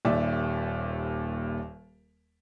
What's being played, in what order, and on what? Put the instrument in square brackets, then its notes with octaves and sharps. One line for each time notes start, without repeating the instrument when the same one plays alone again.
[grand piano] D#1 D#2 D5 E5